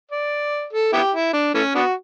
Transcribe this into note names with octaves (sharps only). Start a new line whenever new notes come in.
D5
A4
B3 E4 G4
E4
D4
E3 A3 C#4
B3 D4 F#4